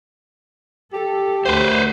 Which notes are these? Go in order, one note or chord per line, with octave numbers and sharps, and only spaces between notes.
G4 A4
D2 F#4 B4 C5 E5